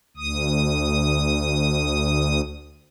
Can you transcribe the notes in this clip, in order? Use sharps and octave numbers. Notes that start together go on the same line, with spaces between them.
D2 D#6